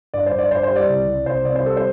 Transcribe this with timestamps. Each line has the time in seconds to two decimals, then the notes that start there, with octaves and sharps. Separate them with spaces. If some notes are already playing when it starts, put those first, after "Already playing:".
0.14 G2 D5
0.26 C5
0.33 G2
0.39 D5
0.51 G2 C5
0.63 C5
0.71 G3
0.76 D5
0.88 C2
1.07 C2
1.26 C2 C5
1.45 C3 D5
1.56 C5
1.63 G3 A4
1.77 C5